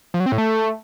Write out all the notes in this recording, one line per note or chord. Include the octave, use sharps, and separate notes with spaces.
F3
F#3
C4
A2
A3